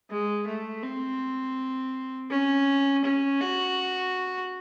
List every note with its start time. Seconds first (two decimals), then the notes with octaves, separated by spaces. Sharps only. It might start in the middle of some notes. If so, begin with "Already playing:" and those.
0.10 G#3
0.47 A3
0.83 C4
2.30 C#4
3.05 C#4
3.40 F#4